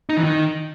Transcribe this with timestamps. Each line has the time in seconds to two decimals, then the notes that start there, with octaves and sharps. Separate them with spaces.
0.09 D#4
0.17 E3
0.24 D#3